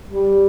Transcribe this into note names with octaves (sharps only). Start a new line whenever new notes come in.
G3